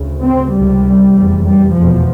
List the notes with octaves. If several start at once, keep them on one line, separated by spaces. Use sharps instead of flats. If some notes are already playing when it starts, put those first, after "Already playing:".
Already playing: D2 C#3
C4
C#2 C3 G3
F1 E2 C3
G3
F1 E2 B2 F3